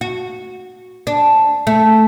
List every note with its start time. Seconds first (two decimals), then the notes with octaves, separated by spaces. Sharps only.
0.01 F#4
1.07 D4
1.67 A3